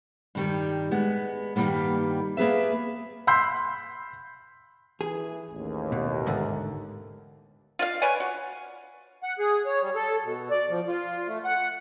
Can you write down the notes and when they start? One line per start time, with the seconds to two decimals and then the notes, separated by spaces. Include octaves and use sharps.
0.35 G2 D#3 G3
0.91 G#3 B3
1.56 G2 D#3 G3 A#3 B3
2.37 A#3 B3 G#4 B4 E5
3.27 B5 C6 E6 G6 C7
5.01 E3 G#4
5.49 A1 D#2
5.92 B2
6.26 G#2 D3 A3
7.79 F4 D5 F5
8.02 B4 C#5 D5 G#5
8.20 F#4
9.23 F#5
9.39 G#4
9.65 C#5
9.81 G3
9.95 A4
10.24 B2
10.50 D5
10.70 F3
10.87 F4
11.27 A3
11.45 F#5